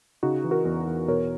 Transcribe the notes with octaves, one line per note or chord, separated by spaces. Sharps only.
C#3 D#4 F#4
E3
F#4 A#4
E2
E2
B2 A#4 C#5